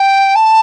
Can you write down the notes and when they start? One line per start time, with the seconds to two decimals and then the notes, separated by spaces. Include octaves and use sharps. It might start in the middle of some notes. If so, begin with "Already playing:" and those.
Already playing: G5
0.35 A5